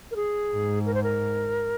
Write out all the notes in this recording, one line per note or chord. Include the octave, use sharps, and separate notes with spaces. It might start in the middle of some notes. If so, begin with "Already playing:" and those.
A#4
G#4
G#2
A#4
C5
A#4